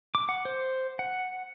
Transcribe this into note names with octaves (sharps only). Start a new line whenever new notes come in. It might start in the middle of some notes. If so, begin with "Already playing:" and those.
D6
F#5
C5
F#5